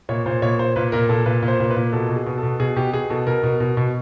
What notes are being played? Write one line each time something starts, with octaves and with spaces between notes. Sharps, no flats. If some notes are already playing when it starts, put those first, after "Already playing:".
A#2 C#5
A#2 C5
A#2 C#5
A#2 C5
A#2 B4
A#2 A#4
A#2 A4
A#2 B4
A#2
C5
A#2
B4
A#2
B2 A4
B2
G#4
B2
A4
B2
B2 G#4
B2 G4
B2 G#4
B2 A4
B2 A#4
B2
B2
B2